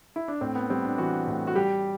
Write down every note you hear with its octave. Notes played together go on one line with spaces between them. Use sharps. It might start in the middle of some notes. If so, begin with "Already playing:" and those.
E4
D4
A2 C4
B3
G3 C4
D4
E3 F#4
A2
F#4
G3 G4